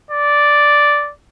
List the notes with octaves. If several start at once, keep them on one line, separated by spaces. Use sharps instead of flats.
D5